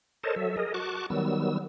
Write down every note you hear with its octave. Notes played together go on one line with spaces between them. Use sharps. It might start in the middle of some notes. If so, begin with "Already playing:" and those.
A4 A#4 C5 C#5 D#5 A5
F#3 A4 E5
G#4 A#4 D#5
F#4 A5 C#6 D6 F#6
D#3 F#3 G3 B3 E6